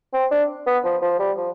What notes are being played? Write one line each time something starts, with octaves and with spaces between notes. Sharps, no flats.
C4
D4
B3
F3
F3
G3
F3